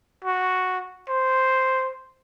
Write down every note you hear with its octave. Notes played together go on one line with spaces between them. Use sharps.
F#4
C5